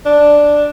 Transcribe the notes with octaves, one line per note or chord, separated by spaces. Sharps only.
D4